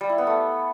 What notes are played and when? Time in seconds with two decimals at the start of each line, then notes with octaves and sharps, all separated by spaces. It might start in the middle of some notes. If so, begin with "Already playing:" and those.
0.01 G3
0.09 E4
0.18 B3
0.27 A3